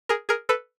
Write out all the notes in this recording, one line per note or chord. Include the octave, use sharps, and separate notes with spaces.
G#4 A#4
G#4 A#4
A4 B4